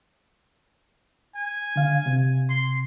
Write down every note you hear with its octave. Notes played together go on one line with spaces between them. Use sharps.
G#5
D3 F5
C3
C6